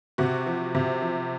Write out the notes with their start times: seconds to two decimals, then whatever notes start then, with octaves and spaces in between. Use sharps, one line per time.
0.18 C3 F#4
0.46 F3
0.75 C3
1.02 F3